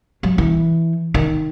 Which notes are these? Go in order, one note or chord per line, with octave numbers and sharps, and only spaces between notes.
F#3
E3
D#3